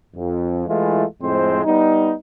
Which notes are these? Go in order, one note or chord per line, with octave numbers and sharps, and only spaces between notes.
F2
E3 G#3 A3 E4 F4
F2 A2 G#3 C4 C5
G3 B3 D#4